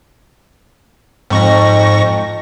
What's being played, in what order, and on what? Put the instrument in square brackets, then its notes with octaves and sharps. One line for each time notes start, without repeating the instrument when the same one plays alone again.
[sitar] F2 [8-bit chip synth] G#2 C#6 A#6